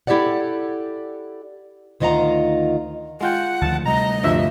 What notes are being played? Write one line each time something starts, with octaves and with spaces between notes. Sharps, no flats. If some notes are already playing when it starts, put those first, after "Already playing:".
E4 G4 A4 D5 F#5
D2 D#3 F4 D#5 F#5 A#5
G#3 F4 F#5 G5
D2 D#3 F3 A5
C3 G3 A3 D#5 A#5
D2 G2 F3 E5